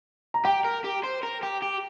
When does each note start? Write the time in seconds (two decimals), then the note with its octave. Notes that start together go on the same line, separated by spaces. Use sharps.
0.34 A#5
0.45 G4 G5
0.64 A#4
0.84 G4
1.03 C5
1.23 A#4
1.43 G4
1.62 G4